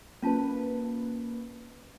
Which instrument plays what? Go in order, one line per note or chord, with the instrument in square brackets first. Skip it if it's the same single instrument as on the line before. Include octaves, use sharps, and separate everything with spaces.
[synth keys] A#3 B4 [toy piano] C#4 F4 A5